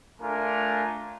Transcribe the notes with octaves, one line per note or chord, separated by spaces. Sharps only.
A3 D4 F4 A#4 G#5